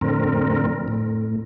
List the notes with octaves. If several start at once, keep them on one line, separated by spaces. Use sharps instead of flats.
F2 A2 D3 C4 A#4
A2